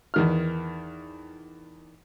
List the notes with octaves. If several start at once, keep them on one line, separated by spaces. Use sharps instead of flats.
E2 D#3 F6